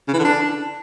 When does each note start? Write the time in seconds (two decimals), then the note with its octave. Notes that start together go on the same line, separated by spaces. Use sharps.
0.08 C#3
0.14 E3
0.19 D3
0.25 D4